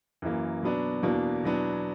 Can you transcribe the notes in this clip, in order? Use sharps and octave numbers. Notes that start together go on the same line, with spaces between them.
F#2 E3 A#3
B2 F#3 B3 D4
E2 B2 A#3 D4
E2 B2 F#3 B3 D4